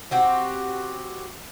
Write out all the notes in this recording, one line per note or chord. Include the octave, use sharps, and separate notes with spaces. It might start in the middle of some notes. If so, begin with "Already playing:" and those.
C4 F#4 G4